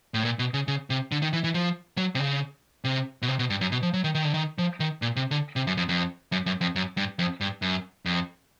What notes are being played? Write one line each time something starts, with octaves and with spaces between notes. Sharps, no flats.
A2
A#2
B2
C#3
C#3
C3
D3
D#3
E3
E3
F3
F#3
C3
C#3
C3
B2
C3
B2
G2
F#2
B2
F3
F#3
D#3
D#3
D3
D#3
F3
D#3
A#2
C3
D3
C3
F#2
F2
F2
F#2
F#2
F2
F#2
G2
F2
G2
F#2
F2